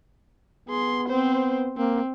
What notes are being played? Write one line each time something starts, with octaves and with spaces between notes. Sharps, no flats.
B3 G#4 C6
C4 C5
A#3 C4